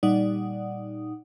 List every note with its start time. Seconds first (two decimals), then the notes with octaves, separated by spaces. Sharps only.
0.03 A#2 G3 D#4 D5 F#5 D#6